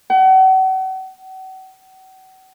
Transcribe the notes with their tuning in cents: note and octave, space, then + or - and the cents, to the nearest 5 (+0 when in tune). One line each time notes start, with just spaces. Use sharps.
F#5 +40